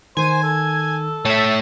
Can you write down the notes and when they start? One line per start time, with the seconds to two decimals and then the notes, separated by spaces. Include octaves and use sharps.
0.17 D#3 C5 G#5
0.43 A4
1.25 A3 C#5 E5 A5